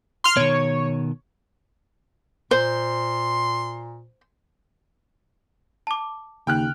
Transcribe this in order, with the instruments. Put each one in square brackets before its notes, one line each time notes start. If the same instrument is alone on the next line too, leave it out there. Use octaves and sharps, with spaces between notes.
[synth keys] C6 F6
[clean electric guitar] B2 D#3 [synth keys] C#5
[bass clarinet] A#2 [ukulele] C5 [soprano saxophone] C6
[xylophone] A5 D6
[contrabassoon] D#2 [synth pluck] C#3 [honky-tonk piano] G5 F6 F#6